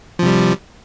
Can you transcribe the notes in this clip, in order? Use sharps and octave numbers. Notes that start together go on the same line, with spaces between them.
C3 F3 G3